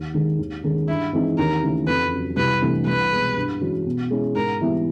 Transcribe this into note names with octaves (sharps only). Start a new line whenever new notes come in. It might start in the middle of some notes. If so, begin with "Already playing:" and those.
Already playing: D#2
D#3 G#3
D#2
D#3 G#3 C#4
G2 E4
E3 G#3 C4 D#4
D#2 A#4
C#3 E3 A3
F2 B4
C#3 F#3
C2 B4
C3 E3 A3 D4
C2 B4
B2 G#3
G2
E3 G#3 C#4 F#4
B2
G#3 C#4 E4
G#2 A#4
E3 G3 B3 E4